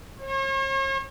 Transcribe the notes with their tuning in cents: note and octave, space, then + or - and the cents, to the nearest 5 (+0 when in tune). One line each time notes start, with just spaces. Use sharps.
C#5 -45